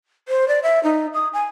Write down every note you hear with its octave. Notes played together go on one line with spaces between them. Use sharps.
C5
D5
E5
D#4
D#6
G#5